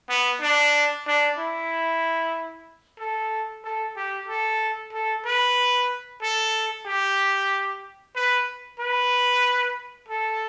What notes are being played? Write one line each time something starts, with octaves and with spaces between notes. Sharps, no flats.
B3
D4
D4
E4
A4
A4
G4
A4
A4
B4
A4
G4
B4
B4
A4